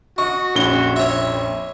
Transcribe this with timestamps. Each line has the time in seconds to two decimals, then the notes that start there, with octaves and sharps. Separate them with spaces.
0.18 F#4 D#5 C#6
0.55 A#1 F2 C#4 G7
0.96 C#5 E5